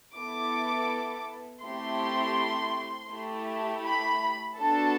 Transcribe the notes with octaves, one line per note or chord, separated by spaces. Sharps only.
B3 E4 A4 D6
A3 C4 E4 G4 C6
A3 E4 G4
B5
B3 D4 F#4 A4 A5